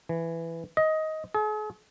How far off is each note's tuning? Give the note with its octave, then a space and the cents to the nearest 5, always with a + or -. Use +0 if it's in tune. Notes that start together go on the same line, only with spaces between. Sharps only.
E3 +10
D#5 +15
G#4 +45